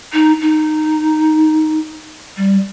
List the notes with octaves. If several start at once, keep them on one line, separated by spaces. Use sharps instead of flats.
D#4
D#4
G3